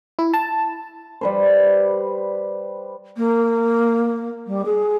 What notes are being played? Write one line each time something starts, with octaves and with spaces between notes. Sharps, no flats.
E4
A5
G3 B4 C5
A#3
G3
G#4